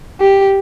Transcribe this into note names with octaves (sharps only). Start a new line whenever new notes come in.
G4